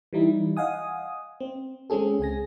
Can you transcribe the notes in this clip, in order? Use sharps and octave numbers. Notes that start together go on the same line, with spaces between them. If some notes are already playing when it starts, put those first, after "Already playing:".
E3 G3 D#4 E4
D#5 F5 F#5 G#5 D#6
C4
G#3 C4 C#4 G#4 A4
C#2 G#4 G#5 A#6